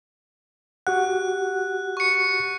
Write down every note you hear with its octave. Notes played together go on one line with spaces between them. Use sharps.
F#4 G4 F#5 F#6
C#6 C#7